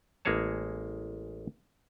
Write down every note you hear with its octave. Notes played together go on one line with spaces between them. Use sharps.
A1 G#3 A#3 G#4 C#5 A5